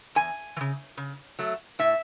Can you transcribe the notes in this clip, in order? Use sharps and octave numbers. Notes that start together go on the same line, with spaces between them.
E2 G#5
E3
C#3
C#3
F#3 A3
A2 E5